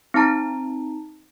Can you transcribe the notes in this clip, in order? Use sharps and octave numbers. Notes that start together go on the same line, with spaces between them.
C4 D#4 A5 A#5